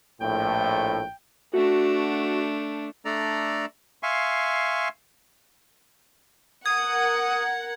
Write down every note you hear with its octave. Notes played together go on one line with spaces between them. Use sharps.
A#1 A2 G5
A3 D4 F#4
A3 D4 A4 D5 A#5
E5 F5 G#5 C6 C#6
A#4 F#5 D#6 G#6